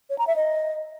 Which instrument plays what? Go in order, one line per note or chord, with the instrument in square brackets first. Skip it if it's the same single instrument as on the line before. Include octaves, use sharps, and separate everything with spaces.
[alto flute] C#5
A#5
E5
D#5